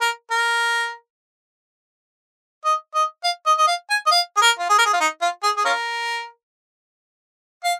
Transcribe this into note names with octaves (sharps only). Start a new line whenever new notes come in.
A#4
A#4
D#5
D#5
F5
D#5
D#5
F5
G#5
D#5
F5
G#4
A#4
F4
G#4
A#4
G#4
F4
D#4
F4
G#4
G#4
C#4 F4 A#4
F5